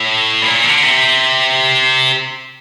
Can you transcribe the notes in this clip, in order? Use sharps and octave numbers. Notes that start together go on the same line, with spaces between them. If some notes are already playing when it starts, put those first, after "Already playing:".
Already playing: A2
A#2
D3
C3